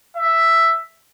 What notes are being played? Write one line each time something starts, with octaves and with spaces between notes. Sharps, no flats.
E5